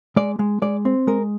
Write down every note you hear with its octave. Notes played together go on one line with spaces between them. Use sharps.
G#3 D5
G#3
G#3 D5
C4
G#3 A#4